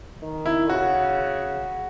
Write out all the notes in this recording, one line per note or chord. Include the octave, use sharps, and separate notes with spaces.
D#3
E4
C#3 F#4